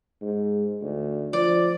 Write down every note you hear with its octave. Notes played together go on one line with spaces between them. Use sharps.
G#2
D2
F3 D5